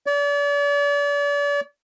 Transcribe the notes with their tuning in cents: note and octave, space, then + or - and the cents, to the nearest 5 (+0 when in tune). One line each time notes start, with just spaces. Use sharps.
D5 -40